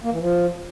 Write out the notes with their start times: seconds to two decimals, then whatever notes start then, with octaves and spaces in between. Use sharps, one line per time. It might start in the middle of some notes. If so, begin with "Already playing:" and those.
0.04 A#3
0.12 E3
0.21 F3